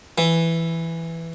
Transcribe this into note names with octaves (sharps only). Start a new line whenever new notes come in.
E3